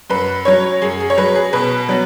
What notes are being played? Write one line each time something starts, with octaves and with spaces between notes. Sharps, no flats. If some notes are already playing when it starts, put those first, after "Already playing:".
F#2 B4
F#3 C#4 C#5
F#2 G#4
G#4
C#5
F#3 C#4 B4
G#4
B2 B4
F#3 B3